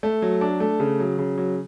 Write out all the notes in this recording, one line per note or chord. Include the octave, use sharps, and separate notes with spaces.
A3
F#3
D4
A3
C#3
F#3
C#3
F#3